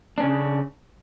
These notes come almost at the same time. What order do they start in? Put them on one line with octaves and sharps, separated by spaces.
D4 C#4 C#3